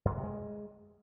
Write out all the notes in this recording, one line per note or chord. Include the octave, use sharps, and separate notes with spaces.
F#2
C#3
C3
G#3